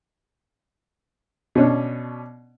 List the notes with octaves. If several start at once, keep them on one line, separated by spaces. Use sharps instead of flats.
B2 C#4 D4